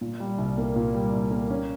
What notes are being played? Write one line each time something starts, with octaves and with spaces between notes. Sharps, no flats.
A#2
G3
C2
A#3
A#2
G3
C2
A#3
C#4